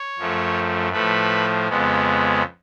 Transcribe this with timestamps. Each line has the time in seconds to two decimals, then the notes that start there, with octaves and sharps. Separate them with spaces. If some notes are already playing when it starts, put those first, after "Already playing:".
Already playing: C#5
0.18 F#2 F3 A3
0.92 A2 F3 A3 B4
1.68 F2 C#3 G#3 B3